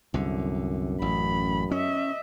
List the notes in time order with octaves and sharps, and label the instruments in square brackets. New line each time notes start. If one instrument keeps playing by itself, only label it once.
[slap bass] C2 D3 [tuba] F#2
[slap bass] A1 [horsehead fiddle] B5
[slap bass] C#4 [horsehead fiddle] D#5 E5